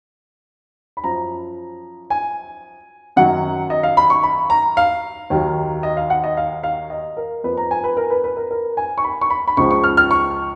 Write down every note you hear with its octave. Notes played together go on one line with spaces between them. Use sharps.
B5
F#2 F3 A#5
G#5
F#2 D#3 F#3 F#5
D#5
F5
B5
C#6
B5
A#5
F5
D#2 D#3 F#3
D#5
F5
F#5
D#5
F5
F5
D#5
A#4
F2 F3 B4
A#5
G#5
B4
A#4
B4
B4
A#4
A#4
G#5
C#6
B5
C#6
B5
B5
C#2 C#3 F3 C#6
C#6
F6
F6
C#6